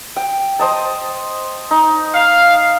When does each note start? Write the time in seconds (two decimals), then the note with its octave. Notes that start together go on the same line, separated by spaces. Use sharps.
0.16 G5
0.59 C5 D#5 A5
1.71 D#4
2.14 F5